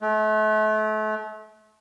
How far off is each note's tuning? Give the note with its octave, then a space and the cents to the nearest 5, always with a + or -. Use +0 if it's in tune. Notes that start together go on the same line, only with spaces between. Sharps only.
A3 -35